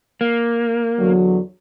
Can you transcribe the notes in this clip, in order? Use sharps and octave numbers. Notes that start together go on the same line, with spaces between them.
A#3
E2 D3 F#3